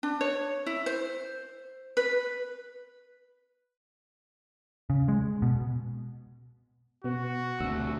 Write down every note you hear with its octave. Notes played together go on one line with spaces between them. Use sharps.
D4
C#5
E4
C5
B4
C#3
G#3
B2
B2 B3 F#4
D2 C3 E6